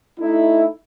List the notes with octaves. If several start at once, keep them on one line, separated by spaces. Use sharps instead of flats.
A3 D#4 E4